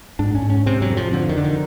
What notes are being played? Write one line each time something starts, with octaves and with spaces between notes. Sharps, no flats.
G#2 D4
C#4
G#2
C#4
C3 C4
F#3
F2
F3
D3 F3
D#3
D3
D#3